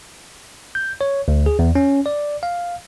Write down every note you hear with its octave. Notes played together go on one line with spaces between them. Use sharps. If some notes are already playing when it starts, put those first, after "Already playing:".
G6
C#5
D2
G#4
E2
C#4
D5
F5